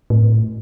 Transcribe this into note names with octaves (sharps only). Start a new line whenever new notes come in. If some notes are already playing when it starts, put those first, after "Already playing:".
A2